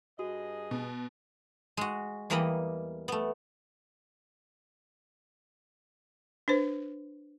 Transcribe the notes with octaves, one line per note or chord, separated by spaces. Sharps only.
G2 F#4 G#4 D#5
B2
G#3 F#4
E2 E3 G3 A#3 D#5 B5
A3 B3
D4 B4 C5